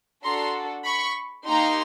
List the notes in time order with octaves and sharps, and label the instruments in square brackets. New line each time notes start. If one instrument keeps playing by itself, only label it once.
[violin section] D4 F#4 A4 A#5 C6
B5 C#6
A#3 D#4 G4 A#5 C6